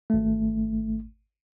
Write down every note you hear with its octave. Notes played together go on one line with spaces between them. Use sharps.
G#1 A3